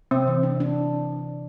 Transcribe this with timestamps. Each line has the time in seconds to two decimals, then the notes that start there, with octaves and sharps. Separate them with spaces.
0.11 C3 C4
0.27 E3
0.43 D4
0.60 D4